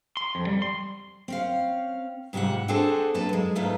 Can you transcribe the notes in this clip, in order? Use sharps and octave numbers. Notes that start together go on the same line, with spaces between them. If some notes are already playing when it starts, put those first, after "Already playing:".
C6
F2
G3
C6
C4 C#4 F5
G#2 C3 G3 F4 F#5
C4 D4 F#4 G#4 A4 C5
F#2 A#3 A4 B4 A5
F#2 G#3
G#2 A3 D#4 F4 B4 E5